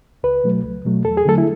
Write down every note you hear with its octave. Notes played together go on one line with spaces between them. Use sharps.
C#2 B4
B2 F#3 A3
C#2
B2 F#3 A3
E2 A4
G#4
D3 F#3 A3 A4
E4